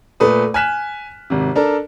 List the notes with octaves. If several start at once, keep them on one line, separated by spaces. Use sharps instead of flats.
A#2 A3 B4 D#6
G#5 F6 F#6 B6 E7
G#1 C3
D4 A4 A#4